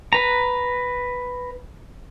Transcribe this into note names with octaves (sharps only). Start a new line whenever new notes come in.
B4 A#5